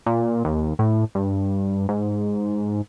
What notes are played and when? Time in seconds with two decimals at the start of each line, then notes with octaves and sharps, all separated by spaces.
0.06 A#2
0.45 D#2
0.79 A2
1.15 G2
1.89 G#2